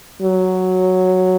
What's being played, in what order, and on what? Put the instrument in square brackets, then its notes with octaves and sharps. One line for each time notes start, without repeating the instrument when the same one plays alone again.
[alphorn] F#3